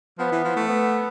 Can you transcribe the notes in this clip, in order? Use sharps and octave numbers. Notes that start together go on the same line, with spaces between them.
F3 B3
E3
F3
A3
B3